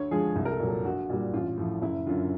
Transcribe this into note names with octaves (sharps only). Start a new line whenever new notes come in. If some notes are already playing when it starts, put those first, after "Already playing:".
Already playing: D2 C#5
D3 F3 G#3 G#4
C2
A#4
A4
A#2 F#3
A4
A#1 F#4
A#2 G3
A1 F4
A2 F3
F#1 E4
F#2 D3 F4